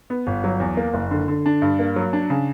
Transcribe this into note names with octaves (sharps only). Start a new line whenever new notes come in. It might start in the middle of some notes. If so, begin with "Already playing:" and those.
B3
G1
F#3
E2
A#3
F#1
D3
D3
D4
G2
A#3
F#3
D4
C#3